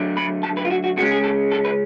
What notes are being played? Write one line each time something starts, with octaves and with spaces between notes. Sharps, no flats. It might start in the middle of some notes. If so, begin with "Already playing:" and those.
Already playing: D3 F#3 A3 D4
B5
A5
B4
F4
F#4
F#4
C#3 G#3 C#4 F#4
G#4
A4
A4
B4